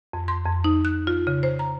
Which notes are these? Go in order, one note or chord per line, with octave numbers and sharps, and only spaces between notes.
F2
C6
F2
D#4
F#6
F4
C#3
C5
A#5